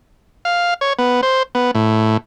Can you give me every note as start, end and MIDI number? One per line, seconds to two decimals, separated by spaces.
0.45 0.74 77
0.81 0.93 73
0.99 1.21 59
1.23 1.43 72
1.55 1.71 59
1.75 2.17 45